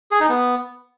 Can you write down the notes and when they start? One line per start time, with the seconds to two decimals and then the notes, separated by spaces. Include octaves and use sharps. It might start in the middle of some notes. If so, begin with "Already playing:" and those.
0.11 G#4
0.20 D#4
0.29 B3